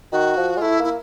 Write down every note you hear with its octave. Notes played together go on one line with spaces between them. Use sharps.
D#3 F#4
F3
G#3 F4
A3 E4
A#3 E4